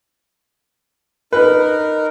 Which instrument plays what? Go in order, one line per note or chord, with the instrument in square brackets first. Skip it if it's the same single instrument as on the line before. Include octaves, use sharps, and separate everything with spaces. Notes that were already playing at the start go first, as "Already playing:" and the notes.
[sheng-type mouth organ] D#4 A#4 [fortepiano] B4